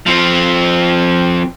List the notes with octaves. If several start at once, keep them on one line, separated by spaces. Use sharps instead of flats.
F3 C4